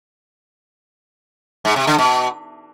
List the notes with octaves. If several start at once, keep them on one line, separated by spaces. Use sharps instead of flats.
G#2
C3
D3
B2